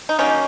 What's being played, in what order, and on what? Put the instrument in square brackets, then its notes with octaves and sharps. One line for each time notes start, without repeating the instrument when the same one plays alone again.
[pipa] D#4
D#3 F#3 A#3 C#4